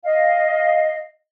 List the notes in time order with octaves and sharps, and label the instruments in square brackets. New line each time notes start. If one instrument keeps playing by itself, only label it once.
[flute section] D#5 F5